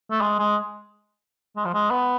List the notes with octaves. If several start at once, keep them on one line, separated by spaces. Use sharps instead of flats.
A3
G#3
G#3
G#3
F3
G#3
B3